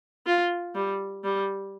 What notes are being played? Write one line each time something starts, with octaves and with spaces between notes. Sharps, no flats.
F4
G3
G3